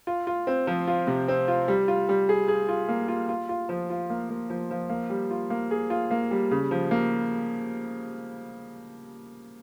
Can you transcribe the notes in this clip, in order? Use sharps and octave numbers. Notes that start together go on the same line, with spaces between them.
F4
F4
C4
F3
F4
C3
C4
F4
G3
F4
G3
G#4
G#4
F4
A#3
F4
F4
F4
F3
F4
A#3
A#3
F3
F3
A#3
G3
F4
A#3
G#4
F4
A#3
G3
C#3
F3
A#3